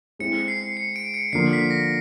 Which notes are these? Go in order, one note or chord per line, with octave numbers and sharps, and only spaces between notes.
G#3 C4 E4 G#4 C#7
C7
C#7
D7
C#7
D3 F3 A#3 C7
B6
A#6